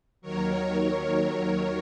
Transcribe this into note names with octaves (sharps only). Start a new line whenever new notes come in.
D#2 D#3 F#3 A#4 C#5